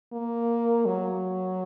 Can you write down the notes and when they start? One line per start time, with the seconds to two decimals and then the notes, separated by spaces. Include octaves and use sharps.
0.13 A#3
0.86 F#3